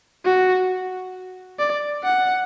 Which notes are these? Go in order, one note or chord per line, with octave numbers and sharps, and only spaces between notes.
F#4
D5
F#5